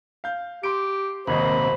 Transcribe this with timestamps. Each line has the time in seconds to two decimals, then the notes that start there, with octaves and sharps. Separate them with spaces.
0.24 F5 G6
0.63 G4 C6 D7
1.27 D#1 G#1 C3 A#3 C5 D#5 B5